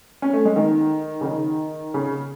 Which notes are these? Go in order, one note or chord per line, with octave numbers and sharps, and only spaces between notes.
C#4
A3
G#3
D#3
C#3
D#3
C#3